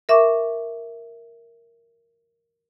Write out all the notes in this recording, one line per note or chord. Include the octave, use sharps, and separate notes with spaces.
A#4 E5 C#6 D6